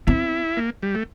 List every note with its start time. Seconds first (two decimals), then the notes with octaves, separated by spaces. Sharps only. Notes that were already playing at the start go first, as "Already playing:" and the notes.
0.07 C4 E4
0.57 A#3
0.82 G3
0.95 A3